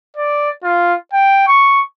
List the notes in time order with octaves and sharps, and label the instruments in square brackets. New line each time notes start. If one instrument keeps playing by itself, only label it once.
[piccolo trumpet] D5
F4
G5
C#6